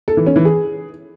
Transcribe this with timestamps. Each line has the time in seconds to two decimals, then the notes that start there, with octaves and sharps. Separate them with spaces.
0.08 A4
0.17 E3
0.26 C#4
0.36 E3
0.45 G#4